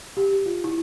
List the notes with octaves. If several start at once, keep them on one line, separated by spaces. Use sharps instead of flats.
G4
F4
E4